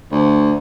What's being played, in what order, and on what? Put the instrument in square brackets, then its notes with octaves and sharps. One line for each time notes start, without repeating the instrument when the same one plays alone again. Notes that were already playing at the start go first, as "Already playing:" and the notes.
[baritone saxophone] D2